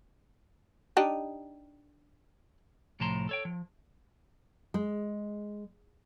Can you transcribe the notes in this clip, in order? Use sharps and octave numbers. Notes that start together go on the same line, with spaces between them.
D4 D#4 G4
C2 A2 F3 A5 A#5 C6
A4 C#5 G5
F3
G#3